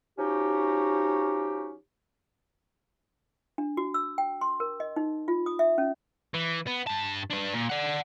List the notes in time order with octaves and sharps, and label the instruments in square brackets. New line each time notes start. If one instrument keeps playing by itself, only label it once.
[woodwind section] F3 C#4 D#4 F#4 G4
[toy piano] D4
F#4
E6
G5
C6
A#4
D#5
D#4
F4
D#6
E5
C#4
[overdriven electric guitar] E3
B3
G2 A5
D4 B4
A#2
D5 F#5